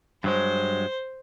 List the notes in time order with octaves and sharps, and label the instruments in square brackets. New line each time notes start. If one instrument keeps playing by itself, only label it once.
[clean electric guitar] G2 F#3 G#3 [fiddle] C5